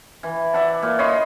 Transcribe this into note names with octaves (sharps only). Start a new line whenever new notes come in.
E3
D5 E5 F#5 A5
A#2
C#5 D#5 B5 C6